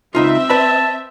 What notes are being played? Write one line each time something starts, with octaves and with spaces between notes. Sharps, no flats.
C#2 C4 D#4 F4 E5
B4 D5 A5 B5